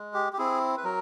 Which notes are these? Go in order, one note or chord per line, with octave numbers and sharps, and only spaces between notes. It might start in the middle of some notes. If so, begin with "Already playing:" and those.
Already playing: G#3
G4
G4
C4 E4 G#4
B4
F#3 A#4